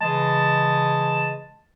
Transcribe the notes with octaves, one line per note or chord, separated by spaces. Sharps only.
C#3 E3 G#3 D#5 A5